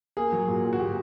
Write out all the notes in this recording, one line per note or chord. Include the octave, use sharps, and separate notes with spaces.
A#3 G#4
F#3
A#2
A#2
F#4
A#2 G4